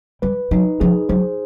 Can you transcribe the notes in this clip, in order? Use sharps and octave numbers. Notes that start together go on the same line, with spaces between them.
G3 B4
F#3 D#4
F3 G#4
F#3 C5